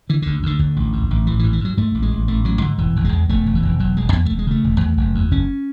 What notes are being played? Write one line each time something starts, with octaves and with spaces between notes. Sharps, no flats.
D3 E3
D2 D3
D2 D3
D2
A1
G#2
A1
A1 E3
E3
G#2
E3
G#2 F#3
G#2 A3
A1
G#3
A1
A1 A3
A1 F#3
G#2 D3
E1 E3
E1
G#3
E2
E1 A3
E1
E3
E1
E1 F#3
E1 G#3
E2 B3
E1 A3
G#3
C#3 A3
E1
E2
F#1
E2
F#1 C#4